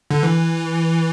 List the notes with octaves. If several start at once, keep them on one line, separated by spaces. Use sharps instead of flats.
D3
E3